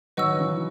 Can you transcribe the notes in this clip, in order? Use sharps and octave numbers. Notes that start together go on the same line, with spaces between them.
D#3 F#3 B4 D#5 F#5 C#6 E6
C#3 E3